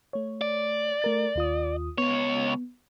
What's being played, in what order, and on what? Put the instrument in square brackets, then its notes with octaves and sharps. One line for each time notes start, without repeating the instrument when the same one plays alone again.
[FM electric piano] A3 C#5
[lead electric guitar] D5
[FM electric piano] A3 A#4 A6
D#2 F4 D#6
[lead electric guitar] C#2 C#5 [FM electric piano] B3